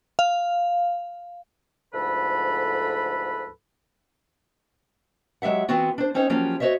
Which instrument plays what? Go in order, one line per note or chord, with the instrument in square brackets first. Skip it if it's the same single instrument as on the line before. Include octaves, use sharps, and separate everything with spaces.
[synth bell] F5
[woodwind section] D2 G#2 F3 A4 B4 B5
[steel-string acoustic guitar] F#3 G#3 G4 E5 F#5
E3 B3 C4 F4 F#4
D4 C5
C4 C#4 D#4 C5 C#5
F3 F#3 A#3 C#4 F4 G4
F#4 C5 C#5 D#5 E5